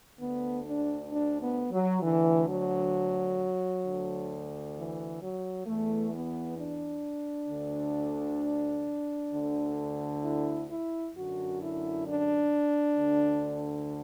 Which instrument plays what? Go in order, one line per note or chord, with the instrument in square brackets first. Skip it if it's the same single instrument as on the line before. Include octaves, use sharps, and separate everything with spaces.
[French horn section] D2 D3 B3
D4
D4
B3
F#3
D2 D3 E3
F#3
D2 D3
E3
F#3
E2 E3 A3
B3
D4
D2 D3
D2 D3
E4
E4
F#2 D3 F#4
E4
D4
D2 D3